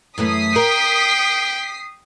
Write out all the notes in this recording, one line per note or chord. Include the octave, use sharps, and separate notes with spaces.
F#2 E3 A3 D#6 B6 C7
A#4 G5